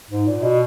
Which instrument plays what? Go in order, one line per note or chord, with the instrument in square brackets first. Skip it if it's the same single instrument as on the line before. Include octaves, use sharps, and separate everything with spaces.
[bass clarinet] G#2
A#2
B2